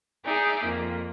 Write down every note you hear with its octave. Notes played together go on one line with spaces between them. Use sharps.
D#4 G#4 D5 E5
F2 A#3